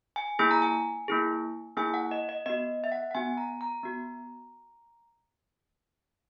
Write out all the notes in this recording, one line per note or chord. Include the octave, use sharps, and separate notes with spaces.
G#5
A#3 E4 G#4 G#5
A#5
G#5
A#3 E4 G#4
A#3 E4 G#4 G#5
F#5
D#5
D#5
B3 F#4 D#5
E5
F#5
F#5
B3 F#4 G#5
A#5
A#5
B3 F#4